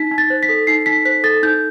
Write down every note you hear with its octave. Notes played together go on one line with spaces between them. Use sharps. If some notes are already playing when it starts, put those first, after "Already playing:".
Already playing: D#4 B6
D#4
A6
C5
B6
A4
D#4 C7
D#4 B6
C5 B6
A4 A6
D#4 G6